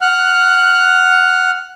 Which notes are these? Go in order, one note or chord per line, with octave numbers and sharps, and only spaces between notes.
F#5 F6 F#6